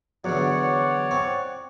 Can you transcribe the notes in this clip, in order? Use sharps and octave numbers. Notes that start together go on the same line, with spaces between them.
E2 D3 F#3 C#5 D5 F#5
C4 C#6